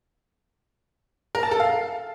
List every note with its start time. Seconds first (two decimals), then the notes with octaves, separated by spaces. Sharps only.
1.35 A#4
1.43 A5
1.51 A4
1.60 F5